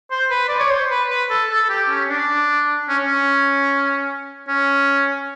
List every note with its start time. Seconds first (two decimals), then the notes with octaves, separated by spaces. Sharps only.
0.11 C5
0.31 B4
0.48 D5
0.59 C#5
0.71 C5
0.90 B4
1.10 B4
1.30 A4
1.50 A4
1.69 G4
1.89 C#4
2.09 D4
2.89 C#4
3.05 C#4
4.48 C#4